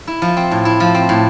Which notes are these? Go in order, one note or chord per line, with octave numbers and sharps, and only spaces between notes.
E4
F3
C4
A2
E4
F3
C4
A2